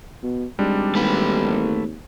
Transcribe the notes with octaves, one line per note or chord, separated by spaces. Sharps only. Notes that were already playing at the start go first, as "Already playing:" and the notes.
B2
G#1 G3 G#3 D4
D#2 A3 B4